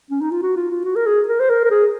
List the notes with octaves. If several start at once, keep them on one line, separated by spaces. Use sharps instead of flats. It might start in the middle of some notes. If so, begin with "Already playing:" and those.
C#4
D#4
F4
F#4
F4
F4
F#4
A#4
G#4
A#4
C5
A#4
A#4
G#4